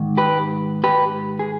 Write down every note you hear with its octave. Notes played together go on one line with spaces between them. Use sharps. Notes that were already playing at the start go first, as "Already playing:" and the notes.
Already playing: G#2 D#3
G4 B4
G4 B4
G#4